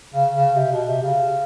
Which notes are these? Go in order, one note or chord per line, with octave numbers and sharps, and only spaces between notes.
C#3
C#3
C3
B2
C3
C#3